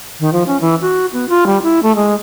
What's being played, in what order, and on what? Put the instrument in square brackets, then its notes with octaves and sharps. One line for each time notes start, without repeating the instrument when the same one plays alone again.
[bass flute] D#3
F3
C#4
E3
F#4
B3
F4
G3
E4
A3
G#3